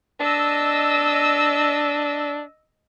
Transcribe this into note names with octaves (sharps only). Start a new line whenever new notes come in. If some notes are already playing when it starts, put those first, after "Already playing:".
D4 D#5 E6